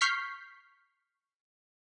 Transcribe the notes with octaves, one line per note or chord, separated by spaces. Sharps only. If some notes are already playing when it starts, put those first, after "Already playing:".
C#6 F6 G6 B6 C7